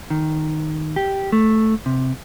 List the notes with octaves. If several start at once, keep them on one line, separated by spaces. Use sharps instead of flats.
D#3
G4
A3
C3